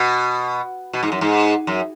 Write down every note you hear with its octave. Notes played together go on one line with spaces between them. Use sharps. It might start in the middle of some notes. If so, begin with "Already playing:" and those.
Already playing: B2
B2
G#2
F#2
G#2
F#2